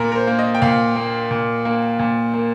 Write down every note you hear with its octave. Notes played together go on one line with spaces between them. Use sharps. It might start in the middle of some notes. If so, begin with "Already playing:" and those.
Already playing: A#2 A#4
A#4
C5
A#3
D#5
G5
A#2 F5
A#3
A#2
A#3
A#2
A#3